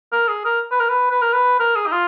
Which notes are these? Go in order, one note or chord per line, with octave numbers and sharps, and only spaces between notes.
A#4
G#4
A#4
B4
A#4
B4
B4
A#4
B4
A#4
G#4
D#4
F4